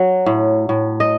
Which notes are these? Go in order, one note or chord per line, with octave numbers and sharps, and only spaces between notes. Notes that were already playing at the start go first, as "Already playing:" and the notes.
Already playing: F#3
A2
A2
D#5